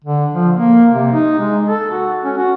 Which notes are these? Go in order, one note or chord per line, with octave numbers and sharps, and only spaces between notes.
D3
F3
A#3
C3
D#4
G#3
A4
F#4
C#4
F#4